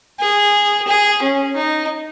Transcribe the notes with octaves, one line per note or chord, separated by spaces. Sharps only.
G#4
G#4
C#4
D#4